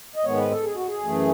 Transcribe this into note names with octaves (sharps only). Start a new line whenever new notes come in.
D#5
G#2 D#3 G#3 B3 C#5
B4
A4
G#4
F#4
G#4
F#2 E3 A3